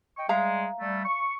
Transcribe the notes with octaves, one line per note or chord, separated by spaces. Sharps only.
D#5 G5 C#6
G3 G#3 E5 F5 A#5
G3 A3
C#6